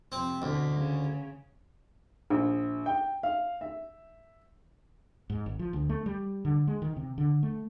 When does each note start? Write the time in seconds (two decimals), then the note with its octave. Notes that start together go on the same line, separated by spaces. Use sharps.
0.12 F2 C3 C4
0.42 D2 B2 E3
0.77 C#3
2.30 A#1
2.86 G5
3.23 F5
3.61 E5
5.30 G#2
5.46 G#1
5.59 F3
5.73 D2
5.89 A3
6.06 G3
6.45 D3
6.67 G#3
6.82 D#3
6.97 C3
7.18 D3
7.43 A3